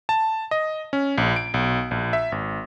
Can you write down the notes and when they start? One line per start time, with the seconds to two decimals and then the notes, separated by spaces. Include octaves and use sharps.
0.09 A5
0.51 D#5
0.93 C#4
1.18 A#1
1.36 D7
1.54 B1
1.91 A#1
2.13 E5
2.32 G#1